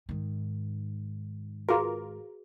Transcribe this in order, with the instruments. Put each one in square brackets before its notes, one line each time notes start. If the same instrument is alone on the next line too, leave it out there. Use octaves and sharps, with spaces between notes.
[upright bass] G#2 D#3
[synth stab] F4 A#4 [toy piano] F#4 G#4 B4